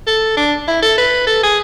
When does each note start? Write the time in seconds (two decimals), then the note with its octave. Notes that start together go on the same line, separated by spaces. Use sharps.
0.07 A4
0.37 D4
0.68 E4
0.82 A4
0.98 B4
1.27 A4
1.43 G#4